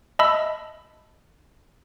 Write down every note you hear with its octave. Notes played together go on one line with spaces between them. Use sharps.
D#5 E5 A5 B5 E6